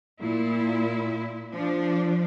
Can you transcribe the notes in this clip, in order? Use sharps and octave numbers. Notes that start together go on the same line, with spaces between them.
A#2 E4
F3 D4